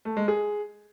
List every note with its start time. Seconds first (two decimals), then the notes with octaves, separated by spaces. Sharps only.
0.05 A3
0.17 G#3
0.28 G#4